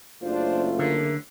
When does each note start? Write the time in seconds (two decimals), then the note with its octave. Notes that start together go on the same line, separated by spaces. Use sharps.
0.23 F#1 A3 D4 F4 C5
0.79 D3 A#3 G#4 A#4